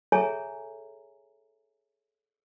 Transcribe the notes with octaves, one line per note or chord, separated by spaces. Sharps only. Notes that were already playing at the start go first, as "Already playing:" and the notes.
G#4 A4 C#5 E5 G#5 A#5